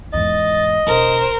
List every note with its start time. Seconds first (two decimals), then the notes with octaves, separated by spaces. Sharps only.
0.14 E2 G#2 D#5 A6
0.87 E1 A#4 C5